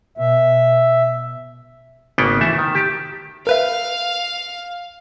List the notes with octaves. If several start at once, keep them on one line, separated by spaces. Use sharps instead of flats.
B2 E5
G#1 C#3 A#3 B3 G5
E3 A3 E5
D#3
G4 A5
A#4 B4 E5 F5